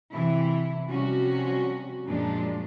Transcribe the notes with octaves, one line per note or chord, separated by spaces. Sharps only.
C3 E3 E4
C3 F3 G3 C#4 F#4
F#2 A#2 F3 G#3 D4